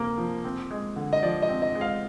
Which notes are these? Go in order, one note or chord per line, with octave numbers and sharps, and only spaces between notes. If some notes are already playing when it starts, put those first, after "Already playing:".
Already playing: D2 C3 A#3
F3
C4
G#3
D3
D#5
F3 D5
D#5
C4
D#5
G#3
F5